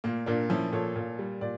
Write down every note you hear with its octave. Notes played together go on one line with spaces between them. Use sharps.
A#2 A#3
A#2 A#3 D4
F3 C#4 E4
A#2 A4 C#5
A#2
G3
A#2 D5